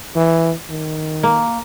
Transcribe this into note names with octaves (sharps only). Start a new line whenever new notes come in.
E3
D#3
A#3